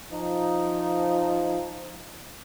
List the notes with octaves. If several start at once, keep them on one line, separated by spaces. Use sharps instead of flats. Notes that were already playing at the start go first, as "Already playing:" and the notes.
F3 D#4